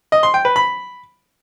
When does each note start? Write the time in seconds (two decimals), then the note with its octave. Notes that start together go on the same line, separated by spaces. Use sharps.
0.12 D#5
0.23 C6
0.34 G5
0.45 B4
0.56 B5